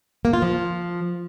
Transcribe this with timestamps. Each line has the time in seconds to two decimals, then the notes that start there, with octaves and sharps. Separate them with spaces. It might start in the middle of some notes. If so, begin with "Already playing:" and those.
0.25 A#3
0.33 F4
0.42 F3